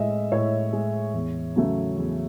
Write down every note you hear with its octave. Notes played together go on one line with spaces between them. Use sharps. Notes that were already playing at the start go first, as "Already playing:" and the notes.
Already playing: A2 G#3 D#5 E5
A2 C#5
G#3
E2
C#3 F#3 A3
E2